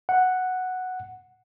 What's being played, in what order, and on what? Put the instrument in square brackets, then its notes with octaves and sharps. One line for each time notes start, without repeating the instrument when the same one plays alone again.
[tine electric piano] F#5